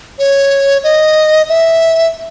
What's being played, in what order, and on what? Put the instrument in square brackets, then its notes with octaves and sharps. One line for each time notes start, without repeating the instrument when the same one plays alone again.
[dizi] C#5
D#5
E5